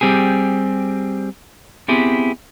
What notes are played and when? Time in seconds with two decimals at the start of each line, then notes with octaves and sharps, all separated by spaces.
0.01 G3 C4 G4 G#4
1.88 B3 C4 E4 G4 G#4